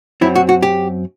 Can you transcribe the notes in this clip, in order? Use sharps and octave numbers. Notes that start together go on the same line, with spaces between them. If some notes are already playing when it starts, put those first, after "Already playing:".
F#2 F#3 C4 E4
F#4
F#4
G4